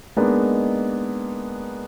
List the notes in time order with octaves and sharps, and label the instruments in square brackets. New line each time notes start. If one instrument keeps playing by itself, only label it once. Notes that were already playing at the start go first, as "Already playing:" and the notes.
[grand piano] G#3 A#3 B3 D4 D#4